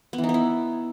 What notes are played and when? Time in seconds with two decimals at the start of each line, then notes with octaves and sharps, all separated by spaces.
0.13 B3
0.18 E3
0.24 D#4
0.29 B3
0.34 E4